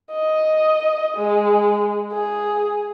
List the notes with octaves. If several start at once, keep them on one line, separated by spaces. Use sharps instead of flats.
D#5
G#3
G#4